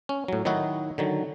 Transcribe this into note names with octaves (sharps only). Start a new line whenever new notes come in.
C#4
A2 F#3
D#3 F#3 D#4 E4 F#4
D3 D#3 F#3